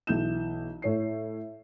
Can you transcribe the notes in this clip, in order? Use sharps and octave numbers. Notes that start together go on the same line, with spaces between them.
B1 E3 G6 E7
A2 C#5 C7